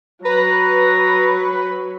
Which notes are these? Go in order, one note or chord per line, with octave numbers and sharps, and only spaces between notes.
F#3 B4 A#5